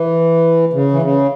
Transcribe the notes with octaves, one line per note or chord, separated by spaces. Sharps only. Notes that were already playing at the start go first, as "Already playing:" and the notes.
Already playing: E3
C#3
E3
C#3